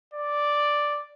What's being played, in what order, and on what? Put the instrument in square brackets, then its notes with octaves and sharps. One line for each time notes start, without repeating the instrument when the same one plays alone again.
[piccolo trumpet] D5